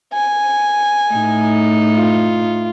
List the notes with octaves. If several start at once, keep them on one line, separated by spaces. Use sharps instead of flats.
G#5
A2 D#4
F4